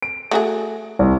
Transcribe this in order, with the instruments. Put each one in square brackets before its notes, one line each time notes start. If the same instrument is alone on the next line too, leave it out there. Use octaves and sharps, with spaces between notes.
[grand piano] D7
[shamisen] A3 F#4 G#4
[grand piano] C2